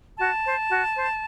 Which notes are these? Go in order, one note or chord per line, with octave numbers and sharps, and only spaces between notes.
F#4 A5
C5
F#4
C5